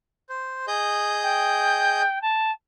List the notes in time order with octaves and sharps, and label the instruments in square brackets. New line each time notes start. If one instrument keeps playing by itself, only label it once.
[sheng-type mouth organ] C5
G#4 D#5 G6
[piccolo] G5
A5